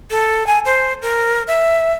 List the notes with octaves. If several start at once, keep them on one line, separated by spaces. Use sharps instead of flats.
A4
G#5
C5
A#4
E5